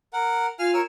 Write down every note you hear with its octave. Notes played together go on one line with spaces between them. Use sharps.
A#4 F#5
F4 F5 G#5 F6
A#4 C#5 E6